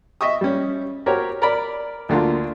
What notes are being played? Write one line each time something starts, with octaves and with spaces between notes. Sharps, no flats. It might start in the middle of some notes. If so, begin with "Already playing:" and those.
D#5 E5 C#6 D#6
G3 C#4
F#4 G4 A#4 C5 C#5
A#4 D5 B5
D2 D3 A#3 F4